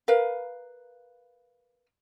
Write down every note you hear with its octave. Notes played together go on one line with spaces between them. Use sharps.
A#4 B4 F5